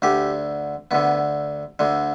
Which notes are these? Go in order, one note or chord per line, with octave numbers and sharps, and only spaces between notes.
D2 D3 G4
D2 D3 B3
D2 D3